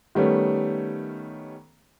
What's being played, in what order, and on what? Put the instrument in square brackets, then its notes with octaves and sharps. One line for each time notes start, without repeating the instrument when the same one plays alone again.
[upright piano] D#3 G3 A3 B3 C#4